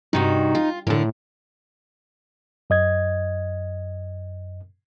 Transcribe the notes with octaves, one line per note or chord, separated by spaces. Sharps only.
G2 C3 D#4 F#4
F4
A2 D3 A#4
F#2 D#5 G#6